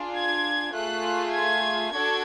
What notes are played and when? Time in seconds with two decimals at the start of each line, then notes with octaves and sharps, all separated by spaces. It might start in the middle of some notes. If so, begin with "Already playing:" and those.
Already playing: D4 F4 G#4
0.15 G#6
0.74 A3 F4 G#4 F#6
1.34 G#6
1.93 D4 F#4 A4 G#6